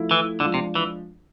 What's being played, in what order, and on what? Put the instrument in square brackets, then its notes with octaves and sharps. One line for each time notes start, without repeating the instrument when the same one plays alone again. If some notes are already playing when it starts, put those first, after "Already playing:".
Already playing: [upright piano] F3 A3 E4
[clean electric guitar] E3
[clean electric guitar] D3 [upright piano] F3 G#3 D4
[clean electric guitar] C3
E3